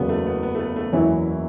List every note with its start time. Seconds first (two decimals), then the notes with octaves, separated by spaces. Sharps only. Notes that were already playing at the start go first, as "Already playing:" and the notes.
Already playing: F#1 E2 C#3 F#3 B3
0.09 A3
0.26 B3
0.43 B3
0.55 A3
0.60 B3
0.76 A3
0.93 F#1 E2 E3 F#3 C#4 E4